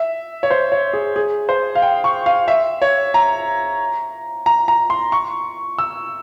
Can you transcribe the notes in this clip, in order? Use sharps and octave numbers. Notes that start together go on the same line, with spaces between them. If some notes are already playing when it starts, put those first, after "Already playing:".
Already playing: E5
C#5
C5
C#5
G#4
G#4
C5
F5
G5
C#6
F5
E5
C#5
A#5
A#5
A#5
C6
C#6
E6